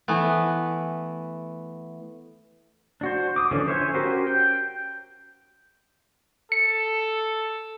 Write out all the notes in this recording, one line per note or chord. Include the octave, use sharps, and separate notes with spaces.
E3 A3 B3
D4 F#4 C5
D6 D#6
D3 E3 F3 C#4 D4
C5 C#5 E5 F5 G#5
C#4 F#4 G4 A#4 C5
G5
A4 C#7